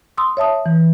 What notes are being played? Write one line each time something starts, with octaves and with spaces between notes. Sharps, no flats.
C6 D#6 E6
C#5 E5 A5 D#6
E3